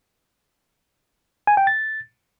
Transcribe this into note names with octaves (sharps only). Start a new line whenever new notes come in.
G#5
G5
A6